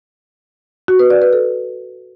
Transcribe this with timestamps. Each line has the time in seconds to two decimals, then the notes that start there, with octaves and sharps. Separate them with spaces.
0.88 F#4
0.99 B4
1.10 D5
1.22 B4
1.33 A4